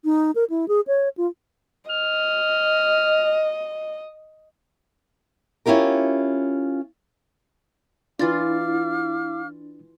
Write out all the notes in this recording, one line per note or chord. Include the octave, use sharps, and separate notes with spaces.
D#4
A#4
E4
G#4
C#5
F4
D#5 F6
C#4 E4 F4 G4 A#4
E3 D4 E4 F4 F5 D6 F6 A6